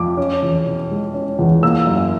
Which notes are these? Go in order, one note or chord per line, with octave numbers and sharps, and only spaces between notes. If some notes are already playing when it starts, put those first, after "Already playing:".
Already playing: F2 D6
C#4
E2
B2
G#3
C#4
E2
A#3 E6
F#2